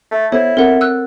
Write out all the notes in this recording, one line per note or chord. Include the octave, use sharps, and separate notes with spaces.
A3
B3 E4 A4 C5 C#5
C4 A4 A#4 F#5
E6 F#6